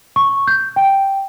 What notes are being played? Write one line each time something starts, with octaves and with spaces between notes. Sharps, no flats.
C#6
G6
G5